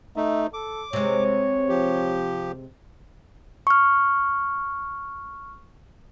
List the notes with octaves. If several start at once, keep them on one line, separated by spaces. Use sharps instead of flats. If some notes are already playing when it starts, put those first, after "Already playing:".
A3 D#4 E5
A4 D6
C3 G#3 C#5
F3 G4
C#6 F6